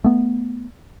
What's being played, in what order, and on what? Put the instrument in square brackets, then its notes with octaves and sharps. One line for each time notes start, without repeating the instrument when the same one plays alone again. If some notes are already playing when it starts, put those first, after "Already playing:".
[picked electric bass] A3 B3